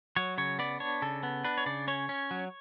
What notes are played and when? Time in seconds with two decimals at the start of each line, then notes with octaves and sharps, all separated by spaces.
0.16 F#3 C#5
0.38 C#3 C#5
0.59 B3 D5
0.80 D4 C#5
1.02 C#3 A4
1.23 B3
1.44 D4 B4
1.58 C#5
1.66 C#3 D5
1.88 C#4 C#5
2.09 C#4
2.31 F#3